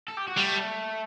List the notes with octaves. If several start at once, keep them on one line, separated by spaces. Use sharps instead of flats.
A4
G4
F#4
G3 A3